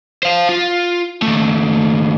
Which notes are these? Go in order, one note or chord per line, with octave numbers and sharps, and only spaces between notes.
C5 F5
F4
D#2 A3